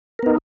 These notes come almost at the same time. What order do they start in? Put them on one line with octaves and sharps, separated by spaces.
A#4 B3 D#4